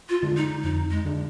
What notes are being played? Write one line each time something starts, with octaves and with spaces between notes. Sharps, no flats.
F4
D3 G#3 D4
D#4
F2 D#4
G#3
D3 G#3 D4